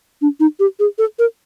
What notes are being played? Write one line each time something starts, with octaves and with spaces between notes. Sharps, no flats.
D4
D#4
G4
G#4
A4
A#4